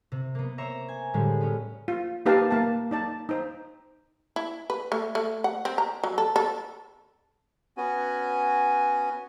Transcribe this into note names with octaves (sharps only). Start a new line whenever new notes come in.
C3
A#3 B3
C5 C#5 E5 A#5
G#5
A2 D3 G3 G#3
B3 C#4
F4
A#3 D#4 G4 B4 F5 A5
A#3 F5 A5
D#4 D5 A5
D#4 C5
E4
B4
A3
A3
F#5
C4
A#5
F#3
A4
A4
B3 C#4 F#4 G#5